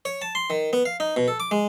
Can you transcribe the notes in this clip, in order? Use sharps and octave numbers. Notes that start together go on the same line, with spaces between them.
C#5
A5
C6
D#3
B3
F5
D#4
B2
A4
D6
G#3